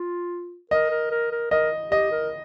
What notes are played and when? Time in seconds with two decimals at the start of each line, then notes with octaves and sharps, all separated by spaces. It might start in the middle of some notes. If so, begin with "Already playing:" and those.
Already playing: F4
0.71 A#4 D#5
0.91 A#4
1.11 A#4
1.32 A#4
1.51 A#4 D#5
1.91 G4 D#5
2.11 A#4